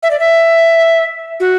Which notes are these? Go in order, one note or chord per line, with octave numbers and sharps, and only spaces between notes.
E5
D5
E5
F#4